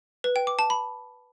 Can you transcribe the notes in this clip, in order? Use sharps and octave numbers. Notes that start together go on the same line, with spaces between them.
B4
G5
D6
A5
B5